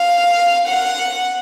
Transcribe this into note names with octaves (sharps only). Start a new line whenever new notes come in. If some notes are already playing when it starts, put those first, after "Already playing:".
Already playing: F5
F#5